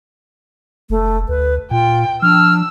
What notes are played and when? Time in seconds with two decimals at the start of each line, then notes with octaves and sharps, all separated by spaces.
0.90 F1 A3
1.29 D2 B4
1.71 A#2 F4 G5
2.22 F3 D4 E6 F6